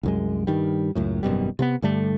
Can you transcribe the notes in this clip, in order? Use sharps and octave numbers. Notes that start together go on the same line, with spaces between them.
C2 F#2 G#3
G2 D#3 G3
C#2 F#2 A2
G#1 F#2 B2 G3
C3 A#3 B3
G2 D3 G3 A3